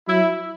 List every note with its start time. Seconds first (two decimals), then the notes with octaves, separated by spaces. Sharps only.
0.08 F#3 E4